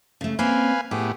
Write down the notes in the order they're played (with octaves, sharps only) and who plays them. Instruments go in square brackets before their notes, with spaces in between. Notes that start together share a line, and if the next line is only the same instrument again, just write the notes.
[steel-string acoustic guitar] C#3 A3
[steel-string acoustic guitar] A#3 C4 C#4 [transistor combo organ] B4 F5 G#5
[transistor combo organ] A2 B3 G4 [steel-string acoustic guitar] G#4